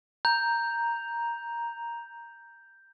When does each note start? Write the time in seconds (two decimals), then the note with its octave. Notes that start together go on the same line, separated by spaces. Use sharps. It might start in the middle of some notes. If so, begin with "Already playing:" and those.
0.25 A#5 G6